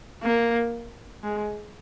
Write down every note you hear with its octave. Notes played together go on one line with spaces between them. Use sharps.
A#3
G#3